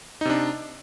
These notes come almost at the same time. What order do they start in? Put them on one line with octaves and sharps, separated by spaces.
D#4 C3 D4